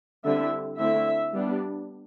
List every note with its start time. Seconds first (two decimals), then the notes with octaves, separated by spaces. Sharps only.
0.25 D3 G3 C4 E4 E5
0.79 D3 A3 C4 E4 E5
1.33 G3 B3 D4